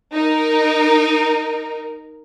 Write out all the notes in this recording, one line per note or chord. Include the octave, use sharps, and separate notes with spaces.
D#4 A#4